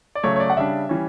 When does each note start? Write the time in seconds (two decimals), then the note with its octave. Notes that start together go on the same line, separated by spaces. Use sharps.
0.15 D5
0.23 C#3 F#3 A3 C#5
0.36 C#5
0.40 D5
0.50 F#5
0.57 C#3 G3 D4 E5
0.89 E3 G3 C#4